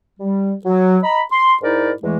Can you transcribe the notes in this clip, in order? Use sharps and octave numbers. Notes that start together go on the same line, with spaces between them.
G3
F#3
D#5 A#5 B5
C6
G#2 D#4 E4 A#4 D5
E2 E3 G#3 A3